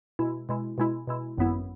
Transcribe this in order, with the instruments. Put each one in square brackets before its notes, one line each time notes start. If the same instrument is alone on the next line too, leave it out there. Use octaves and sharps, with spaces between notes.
[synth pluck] B2 G#3 E4
B2 G#3 E4
B2 G#3 E4
B2 G#3 E4
G#1 F#2 F#3 B3 E4